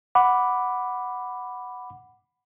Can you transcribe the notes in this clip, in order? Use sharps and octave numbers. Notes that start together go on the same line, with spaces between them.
F#5 B5 D6